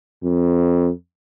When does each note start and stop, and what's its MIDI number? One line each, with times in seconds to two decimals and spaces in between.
0.23 0.90 41